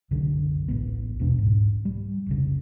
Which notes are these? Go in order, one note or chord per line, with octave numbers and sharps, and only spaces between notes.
F#1 C2 F#2 D3
D1 A1 B3
E2 B2 C#4 D4
C2 G#2
G3
F1 C2 C#3